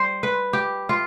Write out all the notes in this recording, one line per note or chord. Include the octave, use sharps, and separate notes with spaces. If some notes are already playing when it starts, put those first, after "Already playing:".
Already playing: G3 C5
B4
G4
F4